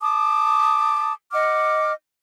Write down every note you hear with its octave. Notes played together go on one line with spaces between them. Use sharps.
A5 D6 D#6
D#5 F#5 D6 F6